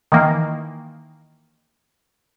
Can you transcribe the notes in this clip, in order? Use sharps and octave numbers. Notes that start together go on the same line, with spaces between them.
D#3 E3 A#3